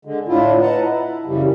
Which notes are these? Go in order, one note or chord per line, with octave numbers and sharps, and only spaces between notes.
D3 G#3
A2 D4 E4 F4
B4 D#5 F#5 A5 A#5
E4
F#2 C#3 E3 G3